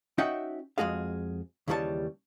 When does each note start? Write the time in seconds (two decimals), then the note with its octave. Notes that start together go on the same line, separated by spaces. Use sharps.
0.18 C#4 D#4 F#4 E5 F#5 G5
0.78 F2 B2 G#3 F#4 G#4 F5
1.68 D#2 C#3 E3 G3 C#5 A5